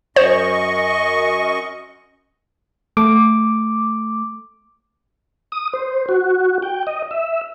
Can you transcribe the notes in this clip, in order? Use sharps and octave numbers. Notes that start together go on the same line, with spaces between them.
F#2 C5 D#5 C#6
A3 D6
D#6
C5
F#4
G5
D#5
E5